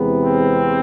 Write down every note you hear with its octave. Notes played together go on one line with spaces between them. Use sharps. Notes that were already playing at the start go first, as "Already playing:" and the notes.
Already playing: E2 C3 G#3 B3
C4